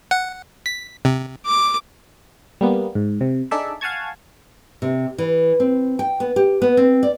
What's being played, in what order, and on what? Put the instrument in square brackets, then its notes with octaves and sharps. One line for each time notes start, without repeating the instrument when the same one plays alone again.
[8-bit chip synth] F#5
B6
C3
[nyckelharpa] D6
[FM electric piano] G3 A#3 B3
G#2
C3
D4 D#4 G#4 A4 D5 E5
F5 F#5 G#5 A5 C#6 G#6
[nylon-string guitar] C3
E3
C4
G5
B3
G4
B3
C4
D5